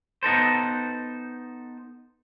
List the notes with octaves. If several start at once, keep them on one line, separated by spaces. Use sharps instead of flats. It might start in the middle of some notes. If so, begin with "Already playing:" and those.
B3 D#4 A4 C5